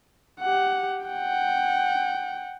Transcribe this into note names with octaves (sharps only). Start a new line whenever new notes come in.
G4 F#5
F#5 G5